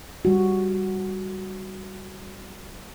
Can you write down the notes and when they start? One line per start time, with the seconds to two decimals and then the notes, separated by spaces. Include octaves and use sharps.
0.25 G3 F#4